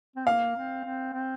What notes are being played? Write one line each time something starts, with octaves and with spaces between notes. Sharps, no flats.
C4
A#3 F5
C4
C4
C4